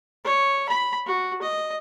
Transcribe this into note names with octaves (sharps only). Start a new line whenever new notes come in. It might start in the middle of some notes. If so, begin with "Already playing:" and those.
C#5
B5
F#4
D#5